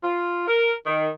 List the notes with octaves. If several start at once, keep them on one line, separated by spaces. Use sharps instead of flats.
F4
A#4
D#3